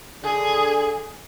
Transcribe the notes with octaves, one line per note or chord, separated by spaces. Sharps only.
D3 G#4